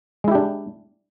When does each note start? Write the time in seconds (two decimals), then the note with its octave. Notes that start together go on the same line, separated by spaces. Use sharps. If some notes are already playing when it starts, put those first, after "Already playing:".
0.24 G#3
0.28 E4
0.31 G4
0.35 D4